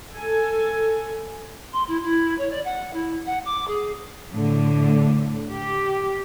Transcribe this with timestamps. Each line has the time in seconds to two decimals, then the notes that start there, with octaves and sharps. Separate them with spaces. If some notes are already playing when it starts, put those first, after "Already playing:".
0.13 A4 G#5
1.73 C6
1.88 E4
2.03 E4
2.38 C#5
2.51 D5
2.65 F#5
2.93 E4
3.27 F#5
3.45 D6
3.68 G#4
4.32 A2 D3
5.49 G4